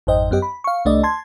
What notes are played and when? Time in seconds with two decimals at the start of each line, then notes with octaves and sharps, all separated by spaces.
0.07 G#1 F2 C5 D#5 G5
0.31 F#2 B3 G4 D#5
0.42 B5
0.64 F5 C#6
0.85 C2 A3 D4 D5 D#5
1.03 A5 C6 G#6